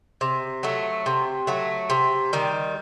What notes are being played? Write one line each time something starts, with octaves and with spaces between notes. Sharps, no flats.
C3
F#3 A3
C3
F#3 A3
C3
D#3 G3